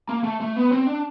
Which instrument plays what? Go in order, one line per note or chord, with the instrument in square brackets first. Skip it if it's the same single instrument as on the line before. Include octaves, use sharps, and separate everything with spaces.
[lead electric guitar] A#3
A3
A3
B3
C4
D4